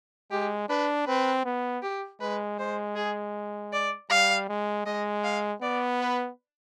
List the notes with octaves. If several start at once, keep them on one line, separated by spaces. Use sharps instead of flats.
G#3 G4
D4 B4
C4 B4
B3
G4
G#3 B4
G#3 C5
G#4
D5
G3 F5
G#3
G#3 D#5
F5
B3 D5
B4